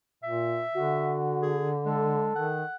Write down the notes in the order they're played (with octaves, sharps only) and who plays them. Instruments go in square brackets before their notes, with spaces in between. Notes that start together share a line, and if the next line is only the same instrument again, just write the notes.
[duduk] A#2 [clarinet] E5
[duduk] D3 [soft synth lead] F#4
[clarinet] G#4
[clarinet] G#3 [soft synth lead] A4
[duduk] D#3 [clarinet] F#5